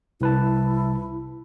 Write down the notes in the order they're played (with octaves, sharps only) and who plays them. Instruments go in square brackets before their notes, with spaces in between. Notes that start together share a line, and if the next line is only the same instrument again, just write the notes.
[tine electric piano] C2 B4 A5 [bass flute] E4